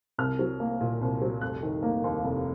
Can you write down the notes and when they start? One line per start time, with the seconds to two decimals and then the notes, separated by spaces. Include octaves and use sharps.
0.18 C2 F6
0.39 F#3
0.60 A#3
0.81 A#2
1.01 C2
1.21 F#3
1.41 F1 F#6
1.63 D#3
1.83 A#3
2.04 D#2
2.25 F1